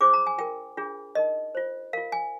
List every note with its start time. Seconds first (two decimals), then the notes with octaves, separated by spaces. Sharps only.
0.01 D4 F4 G#4 C5 D6
0.14 A#5
0.27 G#5
0.38 F4 A#4 G5
0.77 D4 F4 G#4
1.15 D#4 A#4 D#5
1.55 F4 C5
1.93 F4 A#4 F5
2.12 G#5